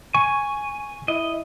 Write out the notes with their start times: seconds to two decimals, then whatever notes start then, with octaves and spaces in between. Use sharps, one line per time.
0.14 G#5 C#6
1.08 E4 D#5